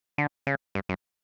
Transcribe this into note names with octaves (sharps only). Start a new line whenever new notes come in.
D3
C#3
G2
F#2